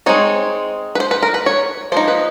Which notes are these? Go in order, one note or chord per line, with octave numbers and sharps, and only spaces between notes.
G#3 C4 D#4 C#5
B4
C5
B4
A#4
B4
C#5
F3 A#3 D#4 C5
B4